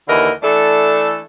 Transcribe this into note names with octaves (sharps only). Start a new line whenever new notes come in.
D#2 D3 E3 A#4 D#5
E3 A3 D4 A4